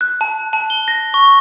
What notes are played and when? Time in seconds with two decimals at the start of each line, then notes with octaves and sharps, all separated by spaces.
0.01 F#6
0.21 A5
0.53 A5
0.70 G7
0.88 A#6
1.14 C#6